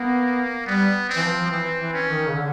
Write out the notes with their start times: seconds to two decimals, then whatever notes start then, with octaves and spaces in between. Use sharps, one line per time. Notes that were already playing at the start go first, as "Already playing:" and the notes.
Already playing: A#3 B3
0.66 G3 B3
1.09 C4
1.16 E3
1.22 F3
1.46 F3
1.51 E3 C4
1.78 E3
1.93 C#4
2.06 D#3
2.28 C#3
2.34 D3